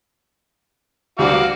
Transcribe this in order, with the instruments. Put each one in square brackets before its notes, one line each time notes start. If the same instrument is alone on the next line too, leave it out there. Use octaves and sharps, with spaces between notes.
[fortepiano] D2 G3 D4 [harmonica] F#4 F5 D6